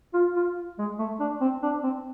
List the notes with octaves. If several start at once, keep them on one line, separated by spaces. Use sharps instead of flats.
F4
F4
G#3
A3
D4
C4
D4
C4